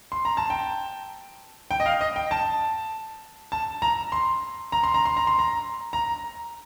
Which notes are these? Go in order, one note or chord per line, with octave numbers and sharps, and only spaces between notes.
C6
A#5
A5
G5
G5
D#5
F5
D#5
G5
A5
A5
A#5
C6
A#5
C6
A#5
C6
A#5
C6
A#5
A#5